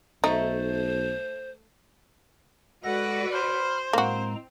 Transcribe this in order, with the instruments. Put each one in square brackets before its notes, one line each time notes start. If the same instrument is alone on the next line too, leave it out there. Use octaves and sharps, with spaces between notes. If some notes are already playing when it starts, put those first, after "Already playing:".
[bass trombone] B1 [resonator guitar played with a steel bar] A3 [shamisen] D#4 [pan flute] C5
[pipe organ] G#3 A4 A#6 [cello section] F#4 B4 D5 [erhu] F#5
[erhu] C5 [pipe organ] B5 F6
[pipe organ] A2 G#3 A#5 [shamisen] A#3 F#4 [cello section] C4